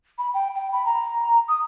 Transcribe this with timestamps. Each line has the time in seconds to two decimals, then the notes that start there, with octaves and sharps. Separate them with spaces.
0.18 B5
0.34 G5
0.55 G5
0.72 B5
0.86 A#5
1.48 D#6